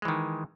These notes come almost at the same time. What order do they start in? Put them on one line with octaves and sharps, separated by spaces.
G#3 E3 D#3